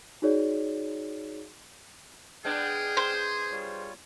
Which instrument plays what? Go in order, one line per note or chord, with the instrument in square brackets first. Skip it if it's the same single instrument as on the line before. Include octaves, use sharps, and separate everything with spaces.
[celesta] D#4 F#4 G#4 C#5 D5
[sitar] G#3 B3 D4 [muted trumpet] G#4 [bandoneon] G5 F6 G6
[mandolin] C5
[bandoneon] G3 F4 C#5